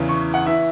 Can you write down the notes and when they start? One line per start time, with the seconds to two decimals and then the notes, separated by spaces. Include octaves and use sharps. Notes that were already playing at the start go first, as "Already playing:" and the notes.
Already playing: E2 C#3 E3
0.09 C#6
0.34 F#5
0.46 E3 E5